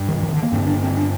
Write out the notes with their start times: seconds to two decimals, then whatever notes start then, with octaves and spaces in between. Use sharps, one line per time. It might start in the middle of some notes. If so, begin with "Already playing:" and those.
Already playing: G2
0.09 D#3
0.23 D#3
0.34 D3
0.43 A#3
0.53 G2 C4
0.57 D3
0.67 D4
0.83 C4
0.97 D4